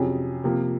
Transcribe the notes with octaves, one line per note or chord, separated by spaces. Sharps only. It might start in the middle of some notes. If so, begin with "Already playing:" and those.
Already playing: F2 C3 F#3 C#4 G#4
C3 F3 A#3